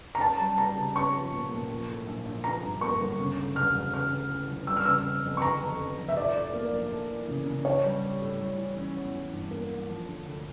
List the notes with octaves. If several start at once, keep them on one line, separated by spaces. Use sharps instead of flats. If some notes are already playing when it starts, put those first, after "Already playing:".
A#5
C#4 A5
G3
G4 A#5
C#3
C#4 C#6
F3
A#2
A#2
F3
A2
A#1
A#1
F3 A#5
G2
A#3 C#6
G1
C#3
D2
E1 F6
E1
C#3 F6
D2
E3
E1
G3 E6
F6
C#3 E6
C#4
F2
C#6
D3 A#5
F2
F1
F1
E5
F3 D5
A2
A#3
A#1
A3
E3
C#3
C#3
D4 C#5
G3
G4
A2
G3
E3
C#4
E2
E3
G2
A#3
A1
F3
D3
D2